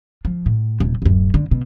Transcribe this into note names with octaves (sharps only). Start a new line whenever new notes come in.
F3
A2
D#1 C3
D1 F#2
D3
B2